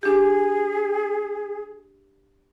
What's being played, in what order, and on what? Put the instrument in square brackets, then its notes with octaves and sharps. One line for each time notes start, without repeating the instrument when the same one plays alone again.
[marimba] D4 G4 [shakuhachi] G#4